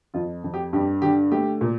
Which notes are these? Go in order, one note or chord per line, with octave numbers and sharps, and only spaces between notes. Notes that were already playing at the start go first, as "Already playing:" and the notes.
F2 F4
F2
G4
G2 G4
D3 G4
A3 G4
A#2